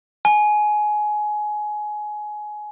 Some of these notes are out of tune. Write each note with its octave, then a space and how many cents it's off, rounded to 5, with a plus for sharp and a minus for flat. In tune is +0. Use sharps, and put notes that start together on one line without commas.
G#5 +20